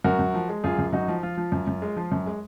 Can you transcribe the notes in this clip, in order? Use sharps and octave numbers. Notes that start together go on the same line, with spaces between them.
F#2 F#4 A#4
F#2
F3
G#3
F#2 F4 G#4
F#2
F#2 D#4 F#4
F3
F3 F4
F3
F#2
F#2
G#3
F3
F#2
G#3